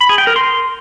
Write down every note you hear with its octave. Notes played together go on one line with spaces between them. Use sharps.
B5
G#4
G5
A#4
C6